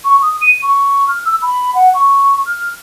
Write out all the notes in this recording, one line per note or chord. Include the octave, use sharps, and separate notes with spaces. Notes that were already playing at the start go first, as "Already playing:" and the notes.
C#6
D#6
D#7
C#6
F6
E6
B5
F#5
C#6
F6